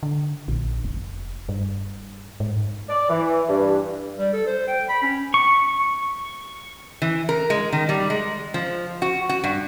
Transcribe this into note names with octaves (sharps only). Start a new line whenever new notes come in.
D3
A#1
F1
G2
G#2
D5
E3
G2
G3
A4
C5
G5
B5
C#4
C#6
E3
A#4
G#3
D#3
G3
G#3
F3
F#4
F#4
G2